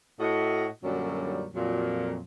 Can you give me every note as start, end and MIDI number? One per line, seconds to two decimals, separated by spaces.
0.20 0.67 45
0.20 0.67 66
0.20 0.67 75
0.84 1.46 42
0.84 1.46 46
0.84 1.46 50
0.84 1.46 54
0.84 1.46 55
0.84 1.46 62
1.55 2.19 41
1.55 2.19 46
1.55 2.19 54